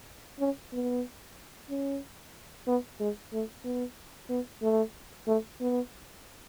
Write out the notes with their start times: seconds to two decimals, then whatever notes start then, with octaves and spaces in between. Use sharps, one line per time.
0.40 C#4
0.73 B3
1.70 C#4
2.67 B3
3.00 G#3
3.33 A3
3.64 B3
4.29 B3
4.62 A3
5.27 A3
5.61 B3